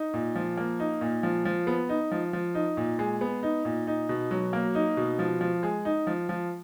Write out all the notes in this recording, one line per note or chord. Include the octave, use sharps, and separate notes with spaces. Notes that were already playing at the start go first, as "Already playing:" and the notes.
Already playing: D#4
A#2
F3
A#3
D#4
A#2
F3
F3
B3
D#4
F3
F3
D#4
A#2
G#3
B3
D#4
A#2
D#4
B2
F#3
A#3
D#4
B2
F3
F3
G#3
D#4
F3
F3